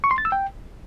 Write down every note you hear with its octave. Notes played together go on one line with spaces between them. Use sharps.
C#6
C6
A6
E6
G5